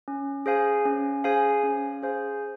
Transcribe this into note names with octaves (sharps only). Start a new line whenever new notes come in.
C#4
G#4 C5 F5 G#5
C#4
G#4 C5 F5 G#5
C#4
G#4 C5 F5 G#5